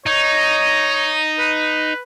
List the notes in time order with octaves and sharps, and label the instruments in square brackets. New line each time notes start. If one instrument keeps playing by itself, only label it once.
[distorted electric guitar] D#4 [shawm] C#5
[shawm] B4